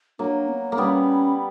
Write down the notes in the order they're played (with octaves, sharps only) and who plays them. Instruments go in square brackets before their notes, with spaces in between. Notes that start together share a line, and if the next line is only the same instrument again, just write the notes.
[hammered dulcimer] F#3 A#3 [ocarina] D4
[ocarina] B3
[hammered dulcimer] A#3
[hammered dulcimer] G3 B3 [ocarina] C#4 D4